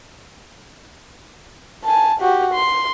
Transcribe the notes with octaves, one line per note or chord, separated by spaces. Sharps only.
G#5 A5
F#4 G4
C6